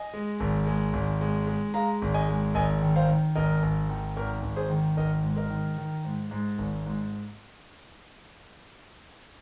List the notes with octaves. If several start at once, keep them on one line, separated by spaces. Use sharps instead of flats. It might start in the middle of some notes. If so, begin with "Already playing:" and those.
Already playing: D#5 G#5
G#3
G#1
G#3
G#1
G#3
G#3
G#3 F5 A#5
G#1
D#5 G#5
G#3
G#1 D#5 G#5
D#3
C5 F5
D#3
G#1 A#4 D#5
G#1
D#3
G#1 A#4
G#1
G#4 C5
D#3
G#1 A#4 D#5
G#2
A#4 D#5
D#3
D#3
G#2
G#2
G#1
G#2